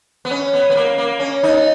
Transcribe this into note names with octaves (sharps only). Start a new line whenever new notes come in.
B3
C#4
B3
B3
A#3
A#3
C#4
D#4